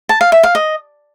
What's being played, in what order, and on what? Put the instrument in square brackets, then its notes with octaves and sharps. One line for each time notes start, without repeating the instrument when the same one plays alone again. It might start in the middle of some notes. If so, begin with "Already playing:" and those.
[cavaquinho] A5
F5
E5
F5
D#5